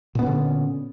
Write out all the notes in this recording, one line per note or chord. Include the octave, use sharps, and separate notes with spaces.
A#2 D3 B3 C#4